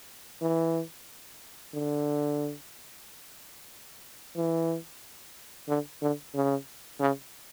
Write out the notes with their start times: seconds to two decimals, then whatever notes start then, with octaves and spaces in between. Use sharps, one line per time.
0.42 E3
1.74 D3
4.36 E3
5.68 D3
6.02 D3
6.35 C#3
7.00 C#3